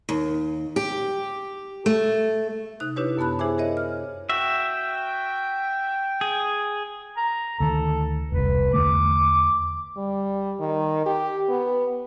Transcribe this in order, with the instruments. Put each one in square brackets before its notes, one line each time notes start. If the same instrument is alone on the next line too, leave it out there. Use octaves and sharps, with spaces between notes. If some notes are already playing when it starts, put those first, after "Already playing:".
[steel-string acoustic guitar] D#2
G4
A3
[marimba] C3 D#4 F#6
D4 E4 G4 B4 C#5
F#2 B3 A5 B5 F#6
E4 G#4 C5 E5 G#5 D6
G#4 A#4 C#5 D#5 E5
F6
[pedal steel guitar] F#4 E5 [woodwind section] G5
[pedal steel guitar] G#4
[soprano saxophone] A#5
[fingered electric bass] D2 D#3 [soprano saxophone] A4
[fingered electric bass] E1 C2 [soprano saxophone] B4
[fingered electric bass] E2 D3 A3 [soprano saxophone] D6
[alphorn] G3
D#3
G4
B3